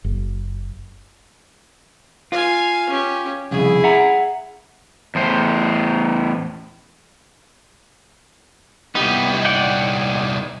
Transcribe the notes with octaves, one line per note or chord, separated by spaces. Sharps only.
F#1
F4 F5 G#5
C#4 G4
C2 F2 C#3 E4 G#4
E5 F#5 A#5
E2 A2 C5
C2 B3 D#4 G4
D5 F#5 G5